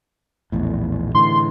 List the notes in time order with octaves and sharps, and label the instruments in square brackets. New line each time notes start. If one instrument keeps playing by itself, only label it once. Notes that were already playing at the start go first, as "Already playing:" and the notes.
[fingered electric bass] A#1 E2 A2
[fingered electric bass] A2 D3 E3 [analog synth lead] C6